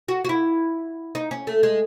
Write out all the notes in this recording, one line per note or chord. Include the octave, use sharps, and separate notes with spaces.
F#4
F#4
E4
D#4
C#4
A3
G#3